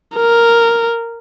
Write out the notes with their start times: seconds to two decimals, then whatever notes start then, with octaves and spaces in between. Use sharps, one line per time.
0.16 A#4